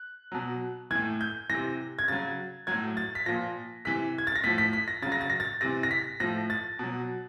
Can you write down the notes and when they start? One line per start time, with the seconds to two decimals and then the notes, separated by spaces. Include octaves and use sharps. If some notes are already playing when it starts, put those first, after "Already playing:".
Already playing: F#6
0.32 B2 F#3
0.91 A2 E3 G#6
1.21 G6
1.50 C3 E3 A#6
1.99 G#6
2.08 C#3 F#3 A6
2.67 A2 F#3 G#6
2.97 A6
3.15 B6
3.26 A#2 F3 A#6
3.85 C3 E3 B6
4.18 G#6
4.27 A6
4.36 A#6
4.44 A2 F3 B6
4.58 B6
4.73 B6
4.88 A#6
5.02 C#3 F#3 A6
5.12 A#6
5.21 A6
5.30 A#6
5.40 A6
5.61 C3 E3 A#6
5.83 A#6
5.91 B6
6.20 A2 F3 A#6
6.50 A6
6.79 B2 F#3